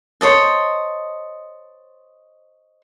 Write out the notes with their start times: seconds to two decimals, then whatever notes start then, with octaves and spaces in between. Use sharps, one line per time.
0.21 C5 C#5 D#5 A5